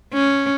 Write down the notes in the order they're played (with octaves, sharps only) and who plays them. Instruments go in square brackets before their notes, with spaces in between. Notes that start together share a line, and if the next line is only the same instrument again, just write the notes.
[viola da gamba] C#4